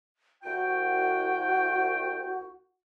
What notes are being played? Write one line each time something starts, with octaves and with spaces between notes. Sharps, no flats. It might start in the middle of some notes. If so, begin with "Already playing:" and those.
C2 F#4 G5